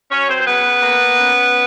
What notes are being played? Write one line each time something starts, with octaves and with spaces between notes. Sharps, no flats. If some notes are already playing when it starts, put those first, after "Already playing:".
F#3 C#4 C#5
C4 C5
C5
C#3 B3 B4
A#3
C#4